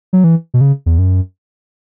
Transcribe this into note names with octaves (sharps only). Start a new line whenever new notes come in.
F#3
E3
B2
C#3
E2
F#2